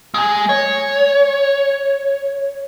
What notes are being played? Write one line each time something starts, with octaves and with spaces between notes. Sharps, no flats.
G#3 G#5
C#5